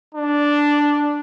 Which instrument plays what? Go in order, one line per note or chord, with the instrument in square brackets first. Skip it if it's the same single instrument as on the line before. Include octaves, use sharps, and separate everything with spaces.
[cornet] D4